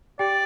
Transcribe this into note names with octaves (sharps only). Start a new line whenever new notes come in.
G4 D5 G5